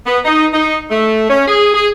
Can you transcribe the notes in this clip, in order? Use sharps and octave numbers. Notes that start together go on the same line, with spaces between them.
B3
D#4
D#4
A3
C#4
G#4
G#4